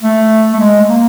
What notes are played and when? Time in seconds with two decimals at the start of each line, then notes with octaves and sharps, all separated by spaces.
0.02 A3
0.53 A3
0.59 G#3
0.88 A#3